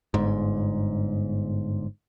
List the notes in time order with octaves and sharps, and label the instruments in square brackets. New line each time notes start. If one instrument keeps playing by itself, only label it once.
[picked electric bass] G1 G#2